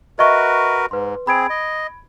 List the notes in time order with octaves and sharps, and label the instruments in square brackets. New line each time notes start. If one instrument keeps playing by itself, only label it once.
[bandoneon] F#4 A#4 B4 [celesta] D#5 E5 C#6
[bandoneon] G#2 [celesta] B4 C6
[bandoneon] C4 G#4 [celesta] B5 G#6 D7
[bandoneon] D#5